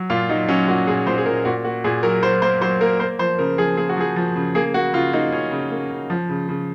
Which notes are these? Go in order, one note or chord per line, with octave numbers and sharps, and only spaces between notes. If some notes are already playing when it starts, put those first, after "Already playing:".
Already playing: F#3
A#2 F4
F#3 D#4
F#3 C#4
A#2 F#4
A#2 G#4
A#2 C5
G#4
A#2 A#4
A#2 F#4
A#3 F#4
A#2 G#4
F#3 A#4
F#3 C5
A#3 C5
F#3 C5
A#3 A#4
A#3 C5
F3 C5
C#3 A#4
F3 G#4
A#3 G#4
F#4
F3 G#4
F3
C#3
A#3 G#4
A#3 F#4
C#3 F4
A#3 D#4
C#3 C#4
C#3
A#3
C#3
F3
C#3
C#3